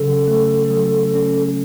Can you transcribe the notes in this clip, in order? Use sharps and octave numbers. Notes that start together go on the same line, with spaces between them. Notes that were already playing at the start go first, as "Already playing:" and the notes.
Already playing: C#3 F#3 C#4 A4
A3
F#3
C#4